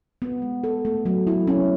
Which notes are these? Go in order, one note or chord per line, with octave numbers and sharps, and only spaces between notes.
B3
G#3
A4
A3
F#3
E4
C#4